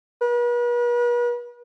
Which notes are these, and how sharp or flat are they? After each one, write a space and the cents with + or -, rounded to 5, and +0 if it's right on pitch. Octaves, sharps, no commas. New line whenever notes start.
B4 -40